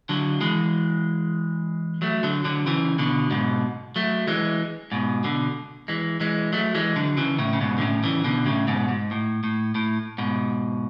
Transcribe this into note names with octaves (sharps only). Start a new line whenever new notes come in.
D3 F#3
E3 G#3
F#3 A3
D3 F#3
D3 F#3
C#3 E3
B2 D3
G#2 B2
F#3 A3
E3 G#3
G#2 B2
B2 D3
E3 G#3
E3 G#3
F#3 A3
E3 G#3
D3 F#3
C#3 E3
A2 C#3
C#3
G#2 B2
D3
A2 C#3
C#3 E3
B2 D3
A2 C#3
G#2 B2
G#2
A2
A2
A2
G#2 B2